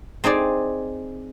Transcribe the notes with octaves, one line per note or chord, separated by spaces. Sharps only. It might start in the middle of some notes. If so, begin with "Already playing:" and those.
C4 D#4 G#4 D5